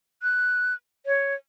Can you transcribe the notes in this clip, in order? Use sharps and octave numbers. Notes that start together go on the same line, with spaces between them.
F#6
C#5